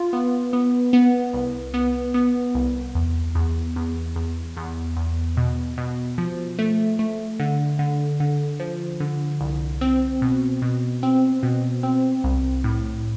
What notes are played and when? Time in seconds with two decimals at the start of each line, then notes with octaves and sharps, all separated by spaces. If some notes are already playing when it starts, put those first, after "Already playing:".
Already playing: F4
0.13 B3
0.53 B3
0.93 B3
1.33 C2
1.74 B3
2.14 B3
2.55 C2
2.95 E2
3.35 E2
3.76 E2
4.16 E2
4.57 E2
4.97 E2
5.37 B2
5.78 B2
6.18 F3
6.59 A3
6.99 A3
7.40 D3
7.79 D3
8.20 D3
8.60 F3
9.00 D3
9.41 C2
9.81 C4
10.22 B2
10.62 B2
11.03 C4
11.43 B2
11.83 C4
12.24 C2
12.64 A2